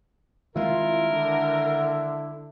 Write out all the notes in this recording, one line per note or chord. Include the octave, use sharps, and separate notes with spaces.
C2 D#3 G#3 E4 F4 A#4
D3